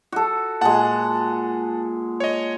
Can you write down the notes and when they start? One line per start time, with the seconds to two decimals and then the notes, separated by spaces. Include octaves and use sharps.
0.12 F#4 A4
0.61 A#2 G#3 F#5 A5
2.20 C#5 D#5